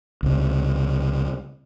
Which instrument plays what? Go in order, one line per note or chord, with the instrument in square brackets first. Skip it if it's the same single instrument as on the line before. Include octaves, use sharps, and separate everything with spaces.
[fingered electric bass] C#2 C3